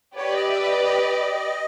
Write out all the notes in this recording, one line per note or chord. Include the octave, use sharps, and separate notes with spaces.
G4 B4 C#5 D5
D#5
E5
E5
D#5
D#5